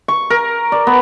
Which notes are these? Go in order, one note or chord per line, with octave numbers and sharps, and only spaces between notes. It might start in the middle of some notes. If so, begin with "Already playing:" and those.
C#6
A#4
D5
B3